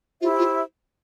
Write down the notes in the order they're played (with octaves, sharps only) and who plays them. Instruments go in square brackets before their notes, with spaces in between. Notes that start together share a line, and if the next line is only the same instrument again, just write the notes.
[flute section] E4 G4 C5 E5 [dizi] F4
[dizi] F4